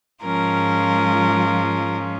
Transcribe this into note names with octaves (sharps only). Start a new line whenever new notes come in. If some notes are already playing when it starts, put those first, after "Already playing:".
G#2 F3 G#3 C#4 F4 A#4